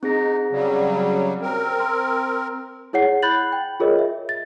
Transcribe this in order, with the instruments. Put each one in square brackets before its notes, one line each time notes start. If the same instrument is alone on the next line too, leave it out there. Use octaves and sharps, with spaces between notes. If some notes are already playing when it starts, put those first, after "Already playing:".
[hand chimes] C4 G#4 A#6 [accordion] D#4
[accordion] C#3 F#3 G3
C4 A#4
[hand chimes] C6
[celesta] E4 G#4 C#5 F#5 C7
B5 F#6 G6 A6 F#7
G5
F4 G#4 A#4 C#5 D#5
E5
A6